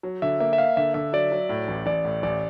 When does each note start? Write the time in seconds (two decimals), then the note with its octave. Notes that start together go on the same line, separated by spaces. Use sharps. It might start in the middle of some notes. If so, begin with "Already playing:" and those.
0.03 F#3
0.22 D3 E5
0.40 A#3 E5
0.53 E5
0.58 A#3 F5
0.77 D3 E5
0.94 D3 E5
1.13 F#3 D5
1.32 F#3
1.49 A2
1.68 A1
1.86 A1 D5
2.04 A2
2.23 A1 D5